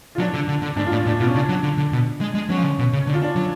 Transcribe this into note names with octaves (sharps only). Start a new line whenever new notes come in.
F4
F#3 D4
D3
D3
D3
G#2 D4
F4
A2 D4
A2 D4
B2 F4
C#4
C#3 D4
F#3
D3
D3
B2
G#3
G#3
F#3 C#4
F3
D3
B2
C#3
D3 D4
F4
D4
F#3